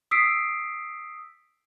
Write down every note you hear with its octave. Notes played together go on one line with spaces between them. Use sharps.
D#6 E6 B6 C7 D7